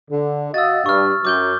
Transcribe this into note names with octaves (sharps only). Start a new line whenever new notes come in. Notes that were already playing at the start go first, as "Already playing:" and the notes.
D3
F#4 D#5 F5 E6 A6
G2 C#6 F6
F#2 D6 G6 G7